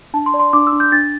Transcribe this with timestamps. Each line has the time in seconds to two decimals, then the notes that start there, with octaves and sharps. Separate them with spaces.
0.14 D4 A5
0.26 C6
0.34 D5
0.39 C6
0.53 D4 D6
0.67 E6
0.73 D4
0.80 G6
0.92 D4 A6